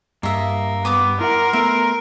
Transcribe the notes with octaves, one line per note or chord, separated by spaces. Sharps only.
G2 A#3 D#5 E5
B3 G4 D6 D#6
E4 A#4 F#5 C6
A3 B3 E5